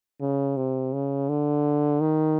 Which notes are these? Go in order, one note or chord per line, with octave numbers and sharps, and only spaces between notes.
C#3
C3
C#3
D3
D#3